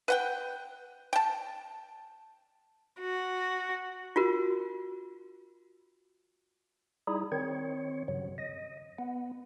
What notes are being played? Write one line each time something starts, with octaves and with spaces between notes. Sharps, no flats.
B4 F#5 G5
G5 A5
F#4
F4 F#4 A#4
G3 D#4 E4 G#4
D#3 C4 C#5
G2 C#3 F#3
D#5
B3